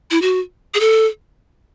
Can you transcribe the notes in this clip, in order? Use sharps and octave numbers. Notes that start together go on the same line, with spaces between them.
E4
F#4
G#4
A4